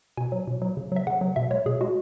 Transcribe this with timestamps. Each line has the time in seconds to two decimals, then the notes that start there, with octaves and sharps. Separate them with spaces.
0.17 B2 G#5
0.32 F#3
0.47 B2
0.62 F#3
0.77 C#3
0.92 F#3 E5
1.07 C#3 F#5
1.21 F#3
1.36 B2 E5
1.51 G#3 C#5
1.66 B2 G#4
1.81 G#3 F#4